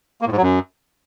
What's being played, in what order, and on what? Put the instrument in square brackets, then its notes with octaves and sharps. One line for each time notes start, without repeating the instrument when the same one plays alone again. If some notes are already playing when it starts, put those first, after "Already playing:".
[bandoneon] A#3
A2
G#2
F#3
F#2